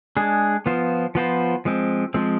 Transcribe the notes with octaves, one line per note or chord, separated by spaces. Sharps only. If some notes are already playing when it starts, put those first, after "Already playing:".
G#3 D4 G#4
F3 B3 F4 C5
F3 B3 F4 C5
F3 G#3 C4
F3 G#3 C4